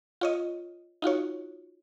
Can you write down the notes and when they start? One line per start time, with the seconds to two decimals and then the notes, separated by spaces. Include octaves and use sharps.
0.21 F4 C#5 D#5
1.02 D#4 F4 F#4 C#5